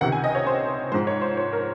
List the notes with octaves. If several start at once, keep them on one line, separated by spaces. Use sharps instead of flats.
C#2 C3 D#3 F#5
G#5
D#5
C#5
C5
G#2 F3 G#3 C5
C#5
C5
C#5
A#4